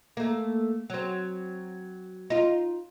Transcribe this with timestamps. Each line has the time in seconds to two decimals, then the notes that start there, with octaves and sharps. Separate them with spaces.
0.17 A3 A#3
0.90 F#3 C4
2.30 D#4 F4